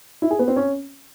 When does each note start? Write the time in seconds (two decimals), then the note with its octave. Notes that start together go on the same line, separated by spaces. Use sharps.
0.22 E4
0.31 G#4
0.39 B3
0.48 C4
0.56 C#4